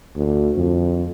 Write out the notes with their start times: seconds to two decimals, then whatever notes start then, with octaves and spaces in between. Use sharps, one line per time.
0.16 D2
0.57 F2